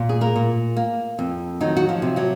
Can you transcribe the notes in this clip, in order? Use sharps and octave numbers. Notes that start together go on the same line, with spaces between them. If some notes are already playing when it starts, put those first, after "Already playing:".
Already playing: A#2
G#4
A#3 A#4
A#2
A#3
F2
D#3 F#3 D#4
F#4
F3 F4
C3
F#3 F#4